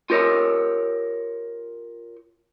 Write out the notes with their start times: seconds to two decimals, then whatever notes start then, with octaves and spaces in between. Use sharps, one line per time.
0.10 F4 G4 A#4 C#5